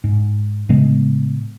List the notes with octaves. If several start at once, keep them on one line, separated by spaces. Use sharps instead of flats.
G#2
A2 C#3 G#3 B3